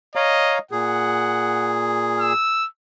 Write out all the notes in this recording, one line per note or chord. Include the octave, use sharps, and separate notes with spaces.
C#5 D#5 F5 A#5
A#2 G#4 F#5
E6